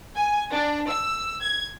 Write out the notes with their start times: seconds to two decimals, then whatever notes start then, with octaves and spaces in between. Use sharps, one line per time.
0.14 G#5
0.51 D4
0.88 E6
1.43 G#6